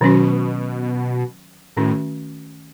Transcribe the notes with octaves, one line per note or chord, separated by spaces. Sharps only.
B2 D#3 F#3 C#4 F#4
A2 D#3 A3 C#4 F#4